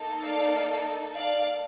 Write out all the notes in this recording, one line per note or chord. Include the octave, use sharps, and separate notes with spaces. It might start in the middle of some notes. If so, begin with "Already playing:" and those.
Already playing: A#3 D#4 A4
D5 F5
D5 F5